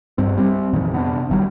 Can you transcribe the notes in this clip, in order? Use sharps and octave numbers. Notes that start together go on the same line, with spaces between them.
G2 C4
G3 C4
F2 A#2 D#3 E3
C3 B3 C#4 D4
F#1 D#3 F#3 G3